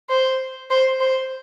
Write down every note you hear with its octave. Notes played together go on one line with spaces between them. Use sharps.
C5
C5
C5